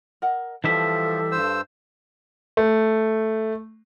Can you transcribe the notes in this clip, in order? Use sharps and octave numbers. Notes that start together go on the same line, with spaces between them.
A#4 D#5 F#5
E3 F3 G3 A4 D#5 E5 A5
G2 C5 F5 E6
A3